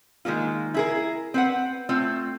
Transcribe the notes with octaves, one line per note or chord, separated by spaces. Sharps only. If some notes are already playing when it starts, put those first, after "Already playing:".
D#3 G#3 A#3 F4
E4 G#4 A#4
C4 B4 F#5
A3 C4 F4